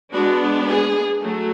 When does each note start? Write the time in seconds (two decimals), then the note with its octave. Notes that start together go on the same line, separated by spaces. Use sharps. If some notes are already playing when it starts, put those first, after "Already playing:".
0.13 G#3 B3 D4 F#4
0.68 G#4
1.22 F#3 A3